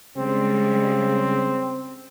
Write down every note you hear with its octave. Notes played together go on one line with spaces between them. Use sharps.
C#3 G3 G#3 C4